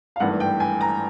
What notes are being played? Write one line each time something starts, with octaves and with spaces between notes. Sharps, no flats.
F5
G#1 G2 E3 A3 F#5
G5
G#5
A#5